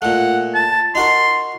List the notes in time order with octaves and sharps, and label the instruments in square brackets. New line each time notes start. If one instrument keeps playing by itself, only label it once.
[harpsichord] A#2 A3 [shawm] F#5
[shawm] A5
[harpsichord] D#4 F#4 A#4 [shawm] C6